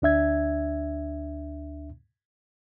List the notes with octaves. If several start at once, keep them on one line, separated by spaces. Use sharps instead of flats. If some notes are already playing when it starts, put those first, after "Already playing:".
D2 D4 E5 G#6